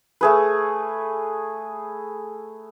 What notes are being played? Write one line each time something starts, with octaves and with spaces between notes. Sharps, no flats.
A3 G#4 B4